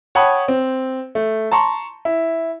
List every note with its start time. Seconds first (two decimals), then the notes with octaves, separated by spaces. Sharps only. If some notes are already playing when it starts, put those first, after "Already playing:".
0.15 C#5 F#5 G5 A5 B5 D#6
0.48 C4
1.15 A3
1.51 A5 A#5 C6 C#6
2.05 E4